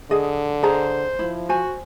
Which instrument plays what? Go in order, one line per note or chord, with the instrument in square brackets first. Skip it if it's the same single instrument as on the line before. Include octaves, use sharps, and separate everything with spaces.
[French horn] D3 [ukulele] G#4 D#5
[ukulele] G#4 D#5 A#5 [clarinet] C5
[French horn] F3 [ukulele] E4
[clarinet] F#4 [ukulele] C5 G#5